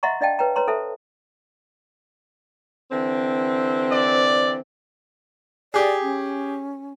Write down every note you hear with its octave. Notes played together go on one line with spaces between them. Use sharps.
D#5 E5 F#5 A#5 C6 C#6
D4 D5 D#5 F5 G5 A5
B4 C#5 G5 A#5
B4 C#5 A#5 C6
A4 C5 E5 A5
D3 E3 C4
D5
G4 G#4 D5
C#4